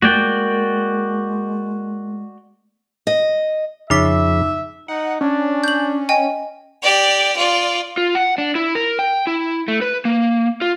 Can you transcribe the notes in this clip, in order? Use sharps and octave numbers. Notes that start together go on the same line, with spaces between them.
G#3 A#3 F#4 D5 G5
D#5
F2 C#3 D#4 E5 D6 B6
D#4 F#5
C#4 D4
G6 F#7
D#5 G5 G#5
G4 D5
F4 D5
F4
F#5
D4
E4
A#4
G5
E4
A3
B4
A#3
F4